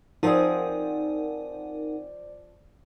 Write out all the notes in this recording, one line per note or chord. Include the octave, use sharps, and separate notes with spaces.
F3 C4 D#4 G#4 A#4 C5 D5 F#5